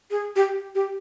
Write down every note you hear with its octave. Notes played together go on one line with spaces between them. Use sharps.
G#4
G4
G4